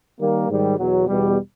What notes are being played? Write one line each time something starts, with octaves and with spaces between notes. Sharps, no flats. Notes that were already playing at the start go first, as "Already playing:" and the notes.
D#3 G3 A#3
G#2 D#3 G3
E2 B2 F#3
E2 B2 G3